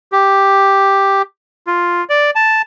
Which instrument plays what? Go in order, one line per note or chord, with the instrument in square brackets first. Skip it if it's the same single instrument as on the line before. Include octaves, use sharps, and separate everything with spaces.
[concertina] G4
F4
D5
A5